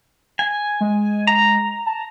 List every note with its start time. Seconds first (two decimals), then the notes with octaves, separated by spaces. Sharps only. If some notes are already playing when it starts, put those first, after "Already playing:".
0.39 G#5
0.81 G#3
1.27 A#5
1.86 A5